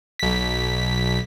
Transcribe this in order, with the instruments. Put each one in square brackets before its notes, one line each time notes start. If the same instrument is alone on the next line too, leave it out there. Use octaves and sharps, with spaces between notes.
[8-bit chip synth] B1 B6